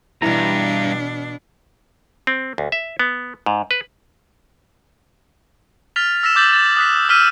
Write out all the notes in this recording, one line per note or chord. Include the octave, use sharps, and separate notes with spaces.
E2 G2 B2 E3 D4 A#5
C4
D2
E5
B3
G#2
B4
F6 A6 B6 F7
E6 A#6 B6 E7
D6 G6 A6 B6 F#7
A6
D#6 F#6 B6
E6 F6 B6 D#7